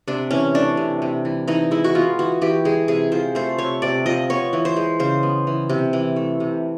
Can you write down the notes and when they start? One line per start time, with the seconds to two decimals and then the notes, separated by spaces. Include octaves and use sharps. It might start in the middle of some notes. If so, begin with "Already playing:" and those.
0.08 C3 D4
0.31 E3 C#4
0.54 A3 D4
0.77 C3
1.02 C3
1.25 E3
1.48 E3 D#4
1.71 G#3 E4
1.84 F#4
1.95 B3 F4
2.19 E3 F#4
2.41 E3 G4
2.65 G#3 G#4
2.88 C3 G#4
3.12 F3 C5
3.35 A3 C5
3.59 C3 C#5
3.82 C3 D5
4.06 F3 D#5
4.29 B3 C#5
4.53 E3
4.65 C5
4.76 G#3
5.00 C#3 C5
5.23 B3
5.47 E3
5.70 C3
5.93 E3
6.16 A3
6.40 C3